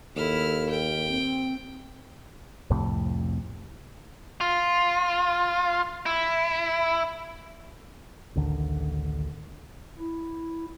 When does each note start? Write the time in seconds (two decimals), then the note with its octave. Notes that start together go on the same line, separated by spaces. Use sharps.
0.17 D#2 E4 A4 F6
0.70 G5
1.07 C4
2.70 C2 F2 A2 C3
4.41 F4
6.06 E4
8.35 A1 D2 D3 D#3
9.98 E4